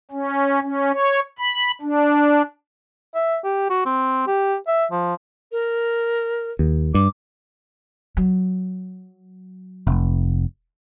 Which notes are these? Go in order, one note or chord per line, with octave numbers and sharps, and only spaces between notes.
C#4
C#4
C#5
B5
D4
E5
G4
F#4
C4
G4
E5
F3
A#4
D#2
G2 D6
F#3
F1